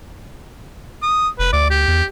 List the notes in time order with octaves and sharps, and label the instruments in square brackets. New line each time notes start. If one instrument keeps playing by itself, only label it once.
[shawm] D#6
[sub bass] F1 [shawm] B4
[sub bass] D2 [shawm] D5
[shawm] G4
[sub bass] E2